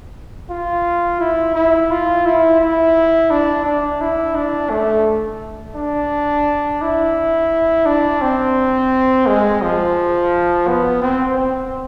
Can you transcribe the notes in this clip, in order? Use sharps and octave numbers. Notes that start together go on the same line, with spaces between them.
F4
E4
E4
F4
E4
E4
D4
D4
E4
D4
A3
D4
E4
D4
C4
G#3
F3
B3
C4
C4